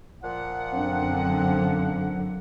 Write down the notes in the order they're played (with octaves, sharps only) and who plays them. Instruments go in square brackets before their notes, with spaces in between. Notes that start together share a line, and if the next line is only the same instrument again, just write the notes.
[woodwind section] A#2 F3 F#5
[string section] F#2 D3 [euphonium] C4 [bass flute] D4